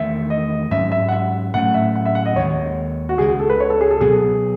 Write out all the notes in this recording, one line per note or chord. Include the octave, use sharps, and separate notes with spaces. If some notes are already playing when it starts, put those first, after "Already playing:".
Already playing: E2 D#3 A3 E5
D#5
G#2 F#3 C#4 E5
E5
F#5
E5
A2 F#3 A3 C#4 F#5
E5
F#5
E5
F#5
D#5
D#2 D#3 G#3 C#5
F#4
C#2 C#3 G#3 G#4
A4
B4
C#5
A4
G#4
A4
B2 F#3 B3 G#4